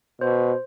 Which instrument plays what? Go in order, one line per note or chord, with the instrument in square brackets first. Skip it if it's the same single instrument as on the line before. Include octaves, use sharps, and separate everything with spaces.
[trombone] B2 [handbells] C5